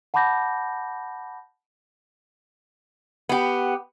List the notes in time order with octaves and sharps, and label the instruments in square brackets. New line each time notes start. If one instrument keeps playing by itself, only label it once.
[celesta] F#5 A5 B5 D6 G6 A#6
[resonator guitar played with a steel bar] B3 G4